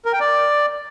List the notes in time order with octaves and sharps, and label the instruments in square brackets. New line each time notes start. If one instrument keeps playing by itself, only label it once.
[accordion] A#4
G5
D5